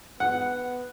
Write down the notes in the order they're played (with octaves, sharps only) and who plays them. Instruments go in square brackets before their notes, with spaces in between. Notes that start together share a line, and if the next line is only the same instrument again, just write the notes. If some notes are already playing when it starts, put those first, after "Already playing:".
[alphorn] B3 [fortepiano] F#5